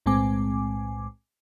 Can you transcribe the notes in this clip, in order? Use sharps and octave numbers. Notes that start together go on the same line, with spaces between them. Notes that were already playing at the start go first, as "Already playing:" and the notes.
B1 A2 G#3 C4 G#5 D6